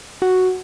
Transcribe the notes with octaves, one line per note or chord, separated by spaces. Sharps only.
F#4